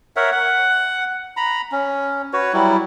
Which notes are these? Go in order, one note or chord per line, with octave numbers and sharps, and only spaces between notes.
A#4 C#5 E5 F#5
F#5
A#5 B5
C#4
F#4 B4 C#5
F#3 G3 E4